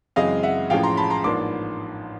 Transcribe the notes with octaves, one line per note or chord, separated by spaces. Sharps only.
F#2 C#3 E3 G#3 C4 D#5 F5
E5 F#5
A1 A2 F3 G#3 C#4 F5 G5
A#5 C6
A5 B5
A#5 C6
A1 G#2 F3 A#3 D4 C6 D6